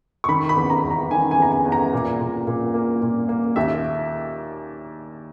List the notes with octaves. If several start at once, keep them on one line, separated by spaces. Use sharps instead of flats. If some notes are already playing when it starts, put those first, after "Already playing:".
C#6
D#3 B5
B5
E2
A#5
E2
A#5
D#3 G#5
G#5
E2 A#5
G#5
E2
A#5
A#2
A#2
A#2
A#3
A#2
A#3
D#2 E5